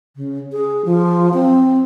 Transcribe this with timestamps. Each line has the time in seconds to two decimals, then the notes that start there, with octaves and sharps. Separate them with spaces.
0.16 C#3
0.52 G#4
0.85 F3
1.33 C4